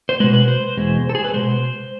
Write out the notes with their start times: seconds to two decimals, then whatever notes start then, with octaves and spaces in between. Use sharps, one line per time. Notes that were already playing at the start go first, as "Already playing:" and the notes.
0.09 C5
0.20 B2 G#3 B4
0.34 B4
0.48 C5
0.77 E2 B2 G#3
1.09 A4
1.15 G#4
1.24 B4
1.34 B2 G#3 C5